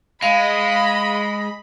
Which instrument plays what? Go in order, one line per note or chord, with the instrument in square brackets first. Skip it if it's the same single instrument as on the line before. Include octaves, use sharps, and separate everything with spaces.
[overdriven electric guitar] G#3 [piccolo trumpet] D#5 [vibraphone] F5 [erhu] B5